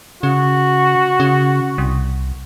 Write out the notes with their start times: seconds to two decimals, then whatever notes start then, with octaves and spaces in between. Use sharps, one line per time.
0.23 C#3 F#4
1.20 C#3
1.78 C2